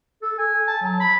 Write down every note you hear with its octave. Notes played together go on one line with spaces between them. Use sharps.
A4
G#5
A5
F#3
B5